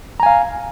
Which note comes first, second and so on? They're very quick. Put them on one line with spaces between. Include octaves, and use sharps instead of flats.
A#5 G#5 F5